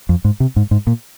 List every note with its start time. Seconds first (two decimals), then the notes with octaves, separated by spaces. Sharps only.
0.09 F2
0.25 G#2
0.40 C3
0.56 G#2
0.71 G#2
0.87 A#2